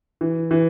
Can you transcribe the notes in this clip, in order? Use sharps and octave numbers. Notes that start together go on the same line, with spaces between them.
E3
E3